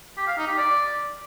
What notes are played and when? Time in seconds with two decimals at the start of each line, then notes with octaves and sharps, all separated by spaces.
0.17 G4
0.27 F5
0.38 D#4
0.48 G4
0.58 D5